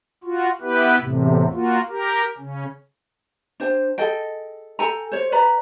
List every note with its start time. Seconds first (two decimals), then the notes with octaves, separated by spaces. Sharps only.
0.24 F4 F#4
0.61 B3 E4 G4 B4
1.00 E2 A2 C3
1.52 A#3 F4 F#4
1.89 G4 A#4
2.38 C#3 C#4
3.60 D4 C5 G5
3.98 G#4 A4 D#5 G5
4.79 A4 G5 G#5 A#5
5.12 C5 C#5
5.32 B4 D5 A#5 B5